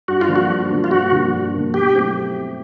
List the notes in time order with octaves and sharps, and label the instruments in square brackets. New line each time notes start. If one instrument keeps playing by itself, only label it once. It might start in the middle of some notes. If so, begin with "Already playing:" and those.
[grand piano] G2 [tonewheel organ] F#4
[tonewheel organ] F4
[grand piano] D3 F3 A#3 D4
[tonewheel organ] F#4
[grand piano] G2
D3 F3 A#3 D4
[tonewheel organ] F4
[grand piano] G2 [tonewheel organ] F#4
[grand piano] D3 F3 A#3 D4
G2
D3 F3 A#3 D4
[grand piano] B2 [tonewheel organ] G4
[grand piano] F#3 A3 C4 E4